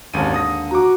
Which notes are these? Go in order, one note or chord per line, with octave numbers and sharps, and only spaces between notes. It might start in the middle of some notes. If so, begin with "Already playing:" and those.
G#1 D#2 D3 G#3 C#4 D#7
D#6 A#6
F#4 A#5 D6